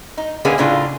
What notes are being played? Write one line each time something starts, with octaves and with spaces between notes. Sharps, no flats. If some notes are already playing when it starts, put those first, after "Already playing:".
D#4
D3 G#3 A#3 B3 C#4 G#4
A2 C#3 D4 F4